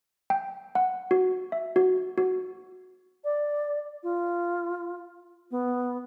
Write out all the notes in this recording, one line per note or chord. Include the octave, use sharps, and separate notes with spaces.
G5
F#5
F#4
E5
F#4
F#4
D5
F4
B3